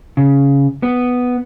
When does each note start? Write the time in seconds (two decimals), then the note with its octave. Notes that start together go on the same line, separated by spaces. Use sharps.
0.17 C#3
0.83 B3